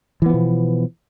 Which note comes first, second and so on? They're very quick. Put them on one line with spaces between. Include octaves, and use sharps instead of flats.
E3 B3 F3 B2